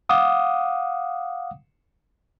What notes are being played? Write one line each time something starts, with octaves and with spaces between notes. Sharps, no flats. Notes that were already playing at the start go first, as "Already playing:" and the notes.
F5 F#5 D6 D#6